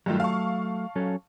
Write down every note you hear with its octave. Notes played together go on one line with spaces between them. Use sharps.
G2 D#3 F#3 A3 F4
F5 A5 C#6
F#3 C#4 A4